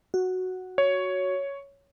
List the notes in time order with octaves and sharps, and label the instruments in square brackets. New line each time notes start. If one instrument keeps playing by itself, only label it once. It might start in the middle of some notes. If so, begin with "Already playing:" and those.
[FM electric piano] F#4
[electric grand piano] C#5